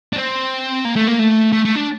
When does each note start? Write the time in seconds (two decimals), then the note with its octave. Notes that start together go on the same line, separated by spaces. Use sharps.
0.13 D4
0.16 C4
0.85 A#3
0.96 A3
1.08 A#3
1.19 A3
1.53 A3
1.65 A3
1.75 D4